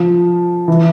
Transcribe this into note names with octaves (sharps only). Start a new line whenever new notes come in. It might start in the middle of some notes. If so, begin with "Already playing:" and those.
Already playing: F3
E3